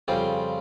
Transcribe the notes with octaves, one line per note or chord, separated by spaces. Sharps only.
F2 C#3 G3 C4 F4